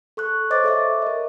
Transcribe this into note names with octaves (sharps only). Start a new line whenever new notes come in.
A4 C#6 F#6
C5 C#5 D#5 D6 A6
A4 C#5 E5 C#6 D6
A#4 D#5